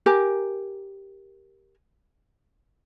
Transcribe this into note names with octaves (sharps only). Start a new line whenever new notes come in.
G4 A#4 G#5